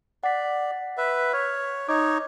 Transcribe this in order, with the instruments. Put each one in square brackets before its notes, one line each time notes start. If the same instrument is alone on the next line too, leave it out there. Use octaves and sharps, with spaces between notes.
[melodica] D5 [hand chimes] F#5 B6
[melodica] B4 E5
[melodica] C#5 [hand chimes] F6
[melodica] D#4 C#5 [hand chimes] D6